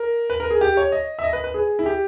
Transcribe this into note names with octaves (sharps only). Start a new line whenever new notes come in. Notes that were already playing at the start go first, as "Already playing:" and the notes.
Already playing: A#4
B4
A#4
G#4
G4
C#5
D#5
E5
D#5
B4
B4
G#4
E4
G4